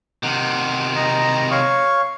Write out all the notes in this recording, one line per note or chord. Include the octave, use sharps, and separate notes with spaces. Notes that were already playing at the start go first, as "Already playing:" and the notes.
C3 D#3 F#5
D#5 A#5
C#5 F5 C#6